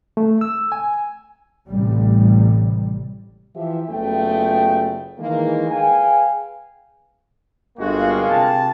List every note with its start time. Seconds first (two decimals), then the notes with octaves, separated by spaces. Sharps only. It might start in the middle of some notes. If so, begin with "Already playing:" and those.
0.17 A3
0.41 E6
0.72 G#5
1.68 A1 C3 G3
3.56 E3 F3 G4 E5
3.89 F#1 C#3 A3 B3 F4 G5
5.19 D#3 E3 G#3 A#3
5.70 G#4 B4 F5 G5 G#5
7.78 G1 G#3 A#3 F4 F#4
8.29 C3 G5 A5